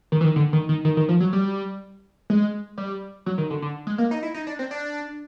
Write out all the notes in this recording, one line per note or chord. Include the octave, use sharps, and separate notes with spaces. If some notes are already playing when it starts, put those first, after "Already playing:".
D#3
E3
D#3
D3
D#3
D#3
D#3
D#3
F3
F#3
G3
G#3
G3
F#3
D#3
D3
D3
G#3
A#3
D#4
E4
D#4
D4
C4
D4